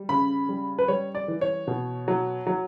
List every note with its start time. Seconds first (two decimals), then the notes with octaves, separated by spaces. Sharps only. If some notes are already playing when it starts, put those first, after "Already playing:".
Already playing: G3
0.09 C#3 B5
0.49 G3
0.79 B4
0.88 G3 C#5
1.15 D5
1.28 E3
1.41 C#5
1.67 B2
2.08 F#3
2.47 F#3